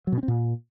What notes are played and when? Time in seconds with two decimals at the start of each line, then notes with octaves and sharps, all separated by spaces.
0.07 F#3
0.12 B2
0.18 C#4
0.23 C4
0.28 A#2